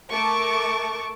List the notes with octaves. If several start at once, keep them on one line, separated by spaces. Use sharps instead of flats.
A3 A#4 A5 C#6 D6